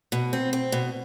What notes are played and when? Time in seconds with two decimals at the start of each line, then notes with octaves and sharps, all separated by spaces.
0.12 B2
0.33 C4
0.53 C4
0.72 B2